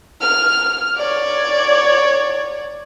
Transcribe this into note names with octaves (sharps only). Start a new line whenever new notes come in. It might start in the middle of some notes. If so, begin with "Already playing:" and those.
F6
C#5 D5